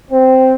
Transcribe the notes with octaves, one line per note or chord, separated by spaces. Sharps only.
C4